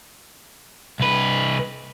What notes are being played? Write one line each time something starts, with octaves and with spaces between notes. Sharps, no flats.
C2 B4